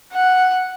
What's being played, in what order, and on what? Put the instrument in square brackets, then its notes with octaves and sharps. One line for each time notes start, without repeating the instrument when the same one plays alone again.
[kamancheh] F#5